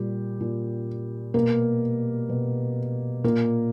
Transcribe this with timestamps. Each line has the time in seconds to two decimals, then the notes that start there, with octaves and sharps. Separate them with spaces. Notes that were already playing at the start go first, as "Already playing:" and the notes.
Already playing: A#2 G3 G4
0.41 A#2
1.34 B2 A#3 A#4
2.29 B2
3.24 A#2 A#3 A#4